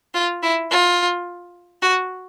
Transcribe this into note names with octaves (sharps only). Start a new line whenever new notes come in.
F4
E4
F4
F#4